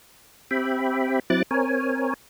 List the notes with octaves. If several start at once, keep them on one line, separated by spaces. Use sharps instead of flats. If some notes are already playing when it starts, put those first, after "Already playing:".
C4 G4 E5 G5 B5
F#3 C4 E4 D6 F#6 A6
C4 A#4 C#5 G#5